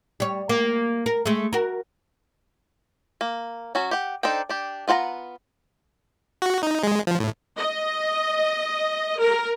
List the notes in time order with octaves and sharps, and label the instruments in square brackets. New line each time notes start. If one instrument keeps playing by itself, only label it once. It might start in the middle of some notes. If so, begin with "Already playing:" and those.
[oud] G3 C#5
A#3
A#4
G#3 A3
F#4 A#4
[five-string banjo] A#3
F#3 C#4 F#4
G4 F#5
D4 D#4 A4 C5 G5
D4 G4
B3 F4 F#5 A5 A#5
[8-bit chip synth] F#4
D#4
G#3
F3
A2
[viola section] D#5
A#4